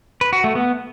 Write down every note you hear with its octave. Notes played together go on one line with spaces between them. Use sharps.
B4
F#4
A3
B3